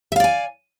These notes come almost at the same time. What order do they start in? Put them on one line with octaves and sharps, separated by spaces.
E5 F5 D5 G#5